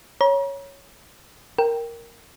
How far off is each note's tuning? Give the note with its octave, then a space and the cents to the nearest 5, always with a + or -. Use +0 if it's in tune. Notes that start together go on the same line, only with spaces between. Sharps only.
C#5 +0 A#5 +40
A#4 +0 G5 +0